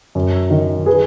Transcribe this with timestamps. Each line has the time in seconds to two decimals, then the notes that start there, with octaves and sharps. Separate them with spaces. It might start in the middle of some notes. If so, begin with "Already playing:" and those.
0.15 F#2
0.50 D#3
0.86 G#4 B4